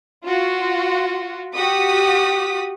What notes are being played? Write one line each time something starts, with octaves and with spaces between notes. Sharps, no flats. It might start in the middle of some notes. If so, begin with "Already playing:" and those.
F4 F#4
F#4 G4 D#6 B6